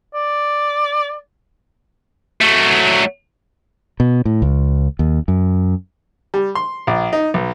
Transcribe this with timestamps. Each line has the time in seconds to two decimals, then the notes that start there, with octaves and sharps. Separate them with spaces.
0.14 D5
2.41 F#3 A3
4.00 B2
4.25 A2
4.42 C#2
4.99 D#2
5.28 F#2
6.34 G3
6.55 C6
6.87 A#1
7.13 D#4
7.34 B1